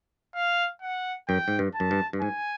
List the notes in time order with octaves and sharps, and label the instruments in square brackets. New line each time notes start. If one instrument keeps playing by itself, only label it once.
[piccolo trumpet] F5
F#5
[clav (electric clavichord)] F#2 [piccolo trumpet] G5
[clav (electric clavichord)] G#2
G2
[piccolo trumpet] A5
[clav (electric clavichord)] F#2
G2
G2
[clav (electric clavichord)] G#2 [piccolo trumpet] G#5